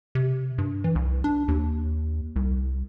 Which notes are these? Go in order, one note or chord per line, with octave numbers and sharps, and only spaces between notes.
C3
G2
E3
C2
D4
D#2
C2